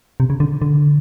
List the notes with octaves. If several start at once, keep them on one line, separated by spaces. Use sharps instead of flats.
C3
C#3
D3
D3